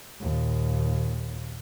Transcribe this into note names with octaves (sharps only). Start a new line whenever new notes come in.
D#2 A#2